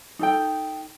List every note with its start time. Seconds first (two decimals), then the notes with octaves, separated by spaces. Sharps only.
0.19 D#4 A4 G5